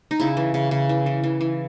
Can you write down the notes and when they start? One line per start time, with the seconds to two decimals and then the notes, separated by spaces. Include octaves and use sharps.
0.11 D#4
0.20 C#3 E4
0.37 E3
0.54 C#3
0.71 C#3
0.89 E3
1.06 E3
1.24 E3
1.41 E3